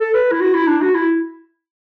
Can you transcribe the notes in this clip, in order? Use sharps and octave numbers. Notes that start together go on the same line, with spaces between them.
A4
B4
E4
F#4
E4
D4
F#4
E4